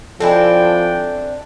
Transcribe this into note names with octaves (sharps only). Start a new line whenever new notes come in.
F3 C4 D4 E4 A4 G5 G#5